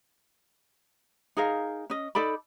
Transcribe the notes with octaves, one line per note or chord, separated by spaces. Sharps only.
D#4 G#4 A#4 F5
C#4 D#5
D#4 A4 D5 B5